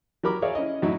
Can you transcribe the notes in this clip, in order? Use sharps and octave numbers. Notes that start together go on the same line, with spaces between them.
F#3 G4 A#4 B5 D6
G#4 A#4 C#5 D5 E5 F5
C#4 E4 D#5
F#2 A2 F#3 D#4 E4